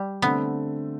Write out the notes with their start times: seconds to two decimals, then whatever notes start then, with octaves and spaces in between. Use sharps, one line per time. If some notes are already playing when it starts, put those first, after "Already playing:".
Already playing: G3
0.22 D3 A3 B3 C4